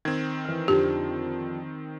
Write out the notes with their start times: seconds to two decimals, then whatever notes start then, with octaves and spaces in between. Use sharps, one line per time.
0.05 D#3 C4 G#6
0.45 E3 F6
0.68 F2 D3 F3 G4